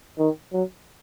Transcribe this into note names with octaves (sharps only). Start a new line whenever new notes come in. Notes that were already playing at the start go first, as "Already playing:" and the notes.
D#3
F#3